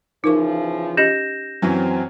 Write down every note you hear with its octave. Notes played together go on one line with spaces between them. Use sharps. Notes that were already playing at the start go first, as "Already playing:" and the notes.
C#3 E3 F3 D#4 A#4 C#6
C#4 G4 D#5 G6 A#6 E7
F#2 E3 F#3 C4